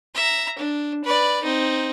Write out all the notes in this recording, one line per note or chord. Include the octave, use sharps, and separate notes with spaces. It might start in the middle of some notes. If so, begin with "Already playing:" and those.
E5 A#5
D4
B4 D5
C4 D#4